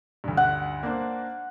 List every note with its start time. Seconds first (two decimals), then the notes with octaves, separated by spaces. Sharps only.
0.24 D2 G2
0.37 F#5
0.83 A#3 D4 C5